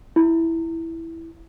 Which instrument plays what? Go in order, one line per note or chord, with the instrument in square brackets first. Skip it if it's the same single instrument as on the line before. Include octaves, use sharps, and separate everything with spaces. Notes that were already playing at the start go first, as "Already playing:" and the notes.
[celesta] E4